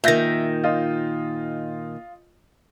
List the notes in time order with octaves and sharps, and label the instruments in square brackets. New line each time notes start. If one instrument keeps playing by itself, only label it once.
[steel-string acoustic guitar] A#2 D#3 [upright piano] E5 G6 A#6
[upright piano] F4 D#5